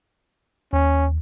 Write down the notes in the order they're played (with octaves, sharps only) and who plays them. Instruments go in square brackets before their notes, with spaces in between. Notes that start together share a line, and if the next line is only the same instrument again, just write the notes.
[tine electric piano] D#2 [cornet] C#4